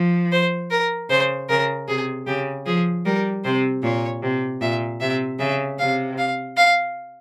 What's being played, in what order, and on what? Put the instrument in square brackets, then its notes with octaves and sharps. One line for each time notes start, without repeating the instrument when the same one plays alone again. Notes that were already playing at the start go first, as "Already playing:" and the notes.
Already playing: [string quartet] F3
[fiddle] C5
A#4
[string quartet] C#3 [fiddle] C5
[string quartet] C#3 [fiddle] A#4
[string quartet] C3 [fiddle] G#4
[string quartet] C#3 [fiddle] G4
[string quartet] F3 [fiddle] G#4
[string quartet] G3 [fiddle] A#4
[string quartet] C3 [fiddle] C5
[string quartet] A#2 [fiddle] C#5
[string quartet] C3
[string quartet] A#2 [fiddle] E5
[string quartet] C3 [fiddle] E5
[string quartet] C#3 [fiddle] E5
[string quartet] C3 [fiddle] F5
[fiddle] F5
F5